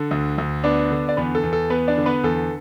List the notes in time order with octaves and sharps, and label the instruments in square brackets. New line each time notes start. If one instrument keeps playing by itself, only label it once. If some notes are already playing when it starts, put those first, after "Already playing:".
Already playing: [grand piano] D3 A4
D2
D2
B3 D4 D5
D3
D5
E2 B3 B4
A4
E2
A4
B3 B4
D4 D5
D3
B3 B4
E2 A4